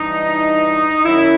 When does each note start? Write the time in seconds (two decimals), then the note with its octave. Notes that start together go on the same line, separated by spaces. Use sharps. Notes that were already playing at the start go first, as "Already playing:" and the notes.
Already playing: G2 E3 D#4
1.03 F#2 D#3 F#3 E4